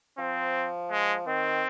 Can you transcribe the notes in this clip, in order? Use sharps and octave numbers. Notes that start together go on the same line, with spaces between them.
F3 C4
G#3
D#3 C4